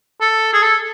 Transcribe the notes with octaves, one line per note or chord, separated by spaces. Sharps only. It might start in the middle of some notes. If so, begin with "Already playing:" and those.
A4
G#4
A4